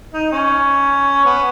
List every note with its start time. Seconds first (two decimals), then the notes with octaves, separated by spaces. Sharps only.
0.13 D#4
0.32 C#4
1.25 B3